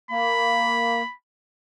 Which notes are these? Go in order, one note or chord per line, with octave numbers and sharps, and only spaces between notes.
A#3 B5